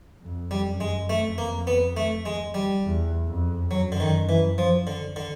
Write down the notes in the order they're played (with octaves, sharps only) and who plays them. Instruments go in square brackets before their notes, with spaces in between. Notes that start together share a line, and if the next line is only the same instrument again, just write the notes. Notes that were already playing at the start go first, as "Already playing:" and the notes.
[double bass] F2
[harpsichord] G3
[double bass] F#2
[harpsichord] G#3
[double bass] F2 [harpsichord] A3
[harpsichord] A#3
B3
A3
G#3
G3
[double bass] E2
F2
[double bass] F#2 [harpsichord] F#3
[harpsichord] D3
D#3
E3
F3
D3
D3